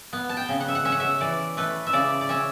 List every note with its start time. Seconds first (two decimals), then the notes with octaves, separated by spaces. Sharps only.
0.13 B3
0.29 A5
0.37 G5
0.49 C#3
0.60 F#5
0.68 E5
0.75 F#5
0.85 C#4 E5
0.92 F#5
1.00 E5
1.20 E3 D5
1.57 A3 B4
1.87 E5
1.93 C#3 D5
2.21 D5
2.29 C#4 E5